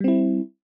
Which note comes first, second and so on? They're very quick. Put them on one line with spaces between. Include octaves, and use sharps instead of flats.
G3 C4 E4